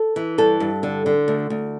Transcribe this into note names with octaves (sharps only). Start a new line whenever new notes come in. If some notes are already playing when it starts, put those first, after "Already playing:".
Already playing: A4
E3
G2 A4
G2
D3
D3
D2
D2